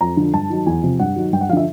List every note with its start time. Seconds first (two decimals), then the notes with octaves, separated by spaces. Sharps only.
0.01 F2 A#5
0.17 D3 F3
0.34 G2 A5
0.50 D#3 F#3
0.66 E2 G#5
0.83 C3 F3
1.00 G2 F#5
1.16 D#3 F#3
1.33 G2 G5
1.41 F#5
1.49 F3 F5
1.53 D3 E5